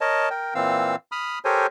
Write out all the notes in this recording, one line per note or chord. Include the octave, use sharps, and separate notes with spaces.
A#4 C#5 D#5 A5
A#4 G5
A#2 E3 C4 F5 E6
B5 D#6 F6
G4 A4 A#4 C5 C#5 G#5